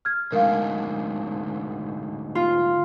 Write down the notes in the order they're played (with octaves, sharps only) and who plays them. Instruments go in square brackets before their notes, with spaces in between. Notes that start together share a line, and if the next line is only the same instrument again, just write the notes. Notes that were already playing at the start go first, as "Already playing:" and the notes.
[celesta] F6 G#6
[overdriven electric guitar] D2 G#2 [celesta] A#4 F5
[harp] F4